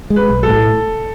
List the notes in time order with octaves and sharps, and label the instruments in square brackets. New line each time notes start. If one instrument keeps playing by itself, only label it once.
[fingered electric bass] G#3
[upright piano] B4
[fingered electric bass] B1
[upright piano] A4
[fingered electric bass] A2